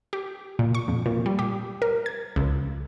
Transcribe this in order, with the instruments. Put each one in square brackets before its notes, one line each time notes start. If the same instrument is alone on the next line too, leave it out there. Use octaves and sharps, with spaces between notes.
[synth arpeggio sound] G4
A#2
C#6
F2
A#2
G3
G4
A#4
G#6
C#2